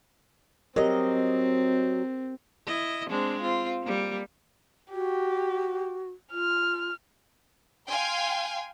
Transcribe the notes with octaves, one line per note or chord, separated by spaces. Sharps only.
F#3 C4 G4 A#4 D#5
E4 D#5
G#3 C4 D4
C4 F4
G3 A#3
F#4 G4
F4 F6
F5 G5 G#5 C6